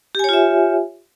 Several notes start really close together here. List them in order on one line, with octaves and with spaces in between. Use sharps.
G4 G#5 C#5 F4 E5